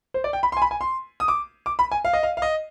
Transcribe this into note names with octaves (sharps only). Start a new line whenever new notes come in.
C5
D5
G5
B5
C6
G#5
B5
G#5
C6
D#6
D6
D6
B5
G#5
F5
D#5
F5
F5
D#5